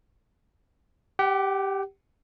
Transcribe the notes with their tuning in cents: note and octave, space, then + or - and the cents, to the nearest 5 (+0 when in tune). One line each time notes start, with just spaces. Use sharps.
G4 +0 F#5 +45